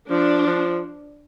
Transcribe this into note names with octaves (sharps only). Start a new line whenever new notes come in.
F3 D4
F3